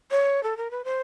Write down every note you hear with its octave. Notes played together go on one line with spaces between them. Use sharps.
C#5
A4
A#4
B4
C5